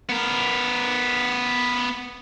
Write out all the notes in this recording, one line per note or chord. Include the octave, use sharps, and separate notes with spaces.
B3 A#4